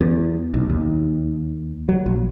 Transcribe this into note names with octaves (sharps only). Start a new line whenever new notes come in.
E2
B1
D#2
F#3
A#1